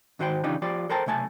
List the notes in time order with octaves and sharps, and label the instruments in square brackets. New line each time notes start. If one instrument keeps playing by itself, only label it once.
[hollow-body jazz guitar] G#2 D#3 F#4 C5 D#5 G5
C#3 E3 D4 D#4 F4 G4
F3 F4 G4 D5
A4 A#4 C5 G5 A5 A#5
B1 C3 A3 G#5 A5